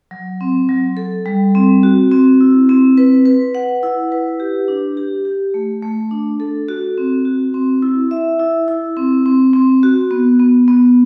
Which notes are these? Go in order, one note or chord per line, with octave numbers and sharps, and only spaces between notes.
F#3
C4
F#3
A4
G3
C4
F#4
C4
E4
C4
B4
B4
F#5
E4
B4
G4
D4
G4
G4
A3
A3
D4
A4
F#4
C4
F#4
C4
E4
E5
E4
E4
C4
C4
C4
F#4
B3
B3
B3